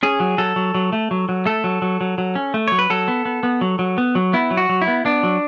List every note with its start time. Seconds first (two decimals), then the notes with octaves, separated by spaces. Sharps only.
0.03 C#4 G#4
0.20 F#3
0.38 F#3 A4
0.56 F#3
0.75 F#3
0.93 A3
1.11 F#3
1.29 F#3
1.46 A3 A4
1.64 F#3
1.82 F#3
2.01 F#3
2.18 F#3
2.35 C#4
2.54 A3
2.68 F#3 C#5
2.79 B4
2.90 F#3 A4
3.08 B3
3.25 B3
3.43 B3
3.61 F#3
3.79 F#3
3.98 B3
4.15 F#3
4.33 B3 E4
4.51 F#3
4.57 F#4
4.69 F#3
4.82 E4
4.88 B3
5.05 B3 D4
5.23 F#3